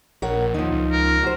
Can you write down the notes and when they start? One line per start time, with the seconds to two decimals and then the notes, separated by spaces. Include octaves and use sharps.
0.22 A#1 A#4 C#5 F#5
0.54 D#2 F3 D#4
0.71 C#2
0.91 A#4
1.23 F#4 C5